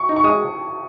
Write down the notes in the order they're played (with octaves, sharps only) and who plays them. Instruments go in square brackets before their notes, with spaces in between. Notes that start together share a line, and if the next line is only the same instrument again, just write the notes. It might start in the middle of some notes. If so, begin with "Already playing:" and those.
Already playing: [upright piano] C#6
[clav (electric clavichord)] D#4
[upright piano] C#6
[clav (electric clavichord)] G#3 [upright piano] D#6